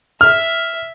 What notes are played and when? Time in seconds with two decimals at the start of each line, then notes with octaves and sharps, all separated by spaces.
0.21 E5 F6